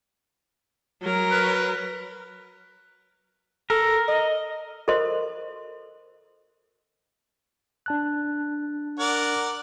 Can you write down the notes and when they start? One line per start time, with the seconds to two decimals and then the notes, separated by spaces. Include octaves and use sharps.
1.02 F#3 A#4
1.31 B4
3.70 A4 A#4
4.08 D#5
4.88 A4 A#4 C5 D#5 C6
7.86 D4 A5 F#6
8.99 A#4 D5 F#5